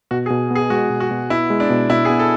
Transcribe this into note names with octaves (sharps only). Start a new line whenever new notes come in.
B2 F#4
G#4
B2
B3
G#4
G#3 F#4
B2
F#4
B2
B3 E4
G#3
D4
B2
B2 E4
G#4
B3
A4